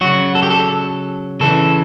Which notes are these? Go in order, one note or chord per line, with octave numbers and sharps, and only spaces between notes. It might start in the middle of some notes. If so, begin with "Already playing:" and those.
C#3 F#3 F#4
A4
G4
A4
C#3 E3 A4